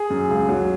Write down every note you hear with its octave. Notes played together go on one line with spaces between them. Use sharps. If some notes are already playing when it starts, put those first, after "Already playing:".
Already playing: G#4
F#2
C#2
F#3